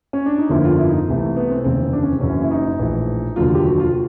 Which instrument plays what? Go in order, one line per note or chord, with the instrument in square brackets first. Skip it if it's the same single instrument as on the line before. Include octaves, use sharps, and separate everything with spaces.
[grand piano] C#4
D4
D#4
G1 F2 D3 F3 A#3 E4
F4
E4
D#4
C2 C3 E3 A3
B3
C4
F1 D#2 C#3 E3 C4
D4
C#4
C4
F#1 F#2 C#3 E3 C#4
E4
D#4
A#1 A2 E3
F1 D#2 D3 F#3 F4
G4
F#4
F4